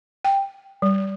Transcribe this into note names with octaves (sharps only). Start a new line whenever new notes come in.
G5
G3